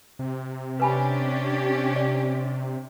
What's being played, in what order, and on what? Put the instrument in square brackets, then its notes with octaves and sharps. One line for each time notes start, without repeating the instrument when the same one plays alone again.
[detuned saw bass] C3
[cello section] C#4 D4 G4 [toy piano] B4 G#5 B5
[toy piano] D5